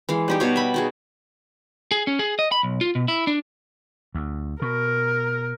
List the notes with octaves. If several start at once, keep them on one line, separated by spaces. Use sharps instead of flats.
E3 G#3 F5
G3 D#4 G4
B2 C#5 F5
E5 B5
D#4 F#4 G#4
G#4
C#4
G#4
D#5
B5
B1
F4
B2
E4
D4
D2
B2 A#4